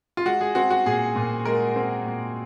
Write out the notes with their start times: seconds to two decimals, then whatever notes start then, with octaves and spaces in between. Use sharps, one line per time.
0.17 F4
0.26 G#3 F#4
0.41 G#4
0.55 C4 F#4
0.70 F#4
0.86 A#2 G#4
1.16 A#2
1.45 G#3 A#4
1.76 C4
2.06 A#2